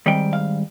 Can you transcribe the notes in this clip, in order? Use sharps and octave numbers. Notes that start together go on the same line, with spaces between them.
G#2 D#3 G3 C4 G5
F5